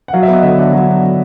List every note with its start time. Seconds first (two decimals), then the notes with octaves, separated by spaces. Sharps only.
0.08 F#5
0.13 F#3 F5
0.23 B3 E5
0.33 D#5
0.43 D3 E5
0.58 D4 F#5
0.73 F#3
0.87 B3
1.03 D3